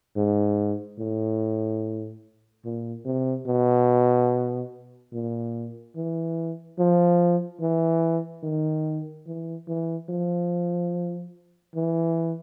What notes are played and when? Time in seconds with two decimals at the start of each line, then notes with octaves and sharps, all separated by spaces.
0.17 G#2
0.99 A2
2.65 A#2
3.05 C3
3.47 B2
5.13 A#2
5.96 E3
6.79 F3
7.61 E3
8.43 D#3
9.27 E3
9.68 E3
10.09 F3
11.75 E3